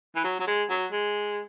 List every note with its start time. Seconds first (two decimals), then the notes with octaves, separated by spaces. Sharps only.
0.15 E3
0.24 F#3
0.40 F#3
0.47 G#3
0.70 F#3
0.92 G#3